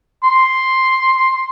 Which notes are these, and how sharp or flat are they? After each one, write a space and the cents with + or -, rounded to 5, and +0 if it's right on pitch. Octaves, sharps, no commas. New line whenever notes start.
C6 +5